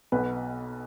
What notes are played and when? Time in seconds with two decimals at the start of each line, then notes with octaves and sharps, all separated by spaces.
0.12 B1 B2 B4